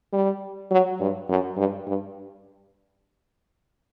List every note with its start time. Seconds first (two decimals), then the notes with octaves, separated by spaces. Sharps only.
0.13 G3
0.71 F#3
1.00 G2
1.29 F#2
1.57 G2
1.87 G2